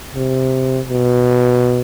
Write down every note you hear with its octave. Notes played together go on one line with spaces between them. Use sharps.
C3
B2